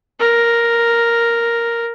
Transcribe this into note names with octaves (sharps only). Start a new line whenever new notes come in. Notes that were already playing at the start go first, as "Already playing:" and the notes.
A#4